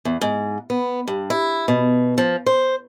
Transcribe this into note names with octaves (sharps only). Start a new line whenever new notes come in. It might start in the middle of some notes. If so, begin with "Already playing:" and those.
E2
G#2
B3
G2
E4
B2
F3
C5